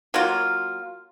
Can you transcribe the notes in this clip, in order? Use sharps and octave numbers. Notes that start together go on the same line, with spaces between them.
F#3 A#3 F4